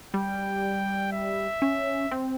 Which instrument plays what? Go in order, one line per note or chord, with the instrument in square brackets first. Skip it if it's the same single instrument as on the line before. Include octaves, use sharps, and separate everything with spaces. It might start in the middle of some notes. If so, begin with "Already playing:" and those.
[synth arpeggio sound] G3 [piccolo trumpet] G5
[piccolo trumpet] E5
[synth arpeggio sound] C#4
C4